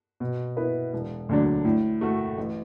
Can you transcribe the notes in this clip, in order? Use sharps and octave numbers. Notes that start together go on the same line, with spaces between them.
B2
B3 E4 B4
E1
D2 D3 F#3 D4
A2
A3 F#4 A4
A1